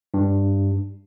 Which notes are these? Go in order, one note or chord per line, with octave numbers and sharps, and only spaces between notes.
G2